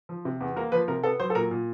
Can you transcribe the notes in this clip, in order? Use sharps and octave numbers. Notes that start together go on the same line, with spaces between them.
F3
C3
E2
A#3 A#4
F3 B4
C3 A#4
B3 A4
F#3 C5
A4
A#2 A#4
A#2